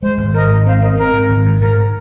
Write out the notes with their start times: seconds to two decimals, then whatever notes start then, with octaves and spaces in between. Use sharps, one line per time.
0.03 G#3 C5
0.18 G#1
0.33 G#2 A#4 D#5
0.50 G#1
0.66 C4 C5 F5
0.82 C4 A#4 D#5
0.97 C4 A#4
1.13 G#2
1.29 G#1
1.46 G#2
1.61 G#2 A#4